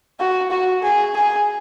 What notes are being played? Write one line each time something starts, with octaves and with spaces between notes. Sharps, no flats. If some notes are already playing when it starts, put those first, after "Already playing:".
F#4
F#4
G#4
G#4